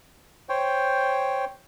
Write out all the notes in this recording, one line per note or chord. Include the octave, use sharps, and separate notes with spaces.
C5 C#5 G5